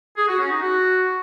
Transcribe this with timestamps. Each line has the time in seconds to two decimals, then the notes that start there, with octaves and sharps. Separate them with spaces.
0.16 G#4
0.28 F#4
0.39 C#4
0.50 D#4
0.62 F#4